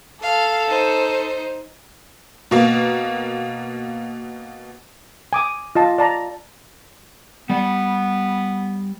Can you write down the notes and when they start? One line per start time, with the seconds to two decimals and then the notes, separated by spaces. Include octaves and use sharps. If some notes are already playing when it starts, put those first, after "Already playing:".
0.22 A4 F5
0.68 D#4 C5
2.51 B2 A#3
5.33 G#5 D6 D#6
5.75 F4 D#5 A5
5.98 D5 A5 A#5
7.50 G3 B3 D5